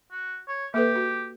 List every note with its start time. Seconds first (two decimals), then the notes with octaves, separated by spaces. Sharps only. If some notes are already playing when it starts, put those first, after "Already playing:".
0.12 F#4
0.49 C#5
0.74 A#3 G4 A4 B4
0.96 F#4